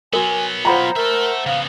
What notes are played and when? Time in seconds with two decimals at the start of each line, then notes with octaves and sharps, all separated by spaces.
0.13 F#3 B3 F#4 A#4 G#5
0.65 F4 C5 F#5 G5 A#5 B5 D#6
0.96 A4 A#4 E5
1.46 C#3 B3 F5